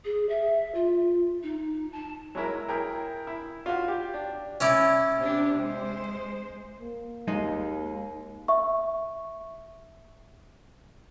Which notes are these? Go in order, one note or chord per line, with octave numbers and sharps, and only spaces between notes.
G#4
E5
F4
D#4
A5
F#3 G#3 E4 A#4
E4 G#4 A#4 G5
E4
F4 F#4
G4
D4
C#4 E4 D5
C3 D4 G4
G#3 C5
A#3
D#2 G#3 D#4 D#5
E5 C#6